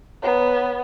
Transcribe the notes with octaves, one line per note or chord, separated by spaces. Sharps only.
B3 C#5 A#5